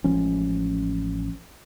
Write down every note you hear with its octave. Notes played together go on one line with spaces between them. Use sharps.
A1 F3 G#3 C#4